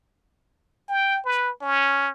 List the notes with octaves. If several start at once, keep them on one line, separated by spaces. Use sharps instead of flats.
G5
B4
C#4